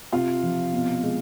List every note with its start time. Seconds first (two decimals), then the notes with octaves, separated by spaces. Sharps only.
0.13 C3 F4 F5
0.43 F3
0.73 B2
1.03 G#3